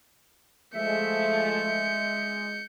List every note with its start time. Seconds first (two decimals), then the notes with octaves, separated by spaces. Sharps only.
0.75 F3 G#3 A3 E5 G6 C#7